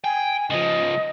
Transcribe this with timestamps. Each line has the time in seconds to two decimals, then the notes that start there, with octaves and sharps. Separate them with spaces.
0.04 G5 G#5
0.50 C#2 F3 D#5